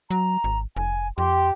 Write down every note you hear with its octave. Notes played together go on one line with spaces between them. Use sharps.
F#3 A#5
G#1
F1 G#5
F2 G4 C6